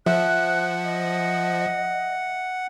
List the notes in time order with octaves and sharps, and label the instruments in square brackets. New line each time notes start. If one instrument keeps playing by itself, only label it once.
[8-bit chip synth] F3 [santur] E5 [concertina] F#5 [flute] F#6
[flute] D#5